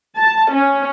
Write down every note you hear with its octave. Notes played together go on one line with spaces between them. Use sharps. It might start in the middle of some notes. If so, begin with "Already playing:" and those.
A5
C#4